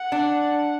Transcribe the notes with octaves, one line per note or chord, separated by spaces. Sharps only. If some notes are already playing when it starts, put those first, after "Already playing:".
Already playing: F#5
D4